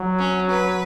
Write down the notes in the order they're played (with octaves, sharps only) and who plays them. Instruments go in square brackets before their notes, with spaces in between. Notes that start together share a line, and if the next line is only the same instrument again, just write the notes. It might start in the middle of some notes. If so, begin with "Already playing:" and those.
Already playing: [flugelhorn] F#3
[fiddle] C#4
B4